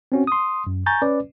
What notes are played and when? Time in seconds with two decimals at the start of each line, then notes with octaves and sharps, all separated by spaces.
0.12 C4 C#4 F#4
0.27 C6 D#6
0.67 F#2
0.86 G#5 A#5 C#6 G6 A6
1.02 C#4 B4 D5